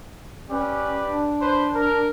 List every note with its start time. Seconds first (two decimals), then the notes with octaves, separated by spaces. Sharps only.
0.50 C#4 G4 B4 D5
1.05 D4
1.41 B4 C5
1.75 A#4